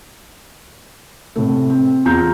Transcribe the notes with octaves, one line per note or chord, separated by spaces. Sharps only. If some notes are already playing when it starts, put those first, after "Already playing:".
A2 C3 A3
C4
E2 F4 A#5 G6